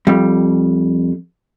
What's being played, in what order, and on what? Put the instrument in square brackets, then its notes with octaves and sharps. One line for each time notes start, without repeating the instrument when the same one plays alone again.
[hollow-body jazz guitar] F2 G3